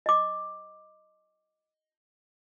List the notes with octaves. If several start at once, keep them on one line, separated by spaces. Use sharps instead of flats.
D#5 D6